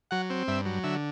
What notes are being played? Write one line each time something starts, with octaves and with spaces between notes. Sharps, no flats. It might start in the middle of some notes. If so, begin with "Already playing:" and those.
F#3 F#5
C4
G2 E5
F#3
D3 E5